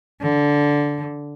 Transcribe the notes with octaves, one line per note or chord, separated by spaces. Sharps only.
D3